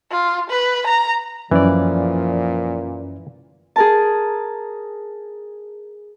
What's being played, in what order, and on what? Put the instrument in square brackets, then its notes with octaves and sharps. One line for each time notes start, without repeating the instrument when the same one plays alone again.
[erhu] F4
B4
A#5
[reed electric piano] F#2 C#4 D5 [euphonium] A#2 [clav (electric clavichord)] E3 [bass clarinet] F3
[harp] G#4 A#4 A5